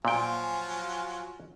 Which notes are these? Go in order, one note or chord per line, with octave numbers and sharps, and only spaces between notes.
A#2 F3 F#3 F4 G5 G#5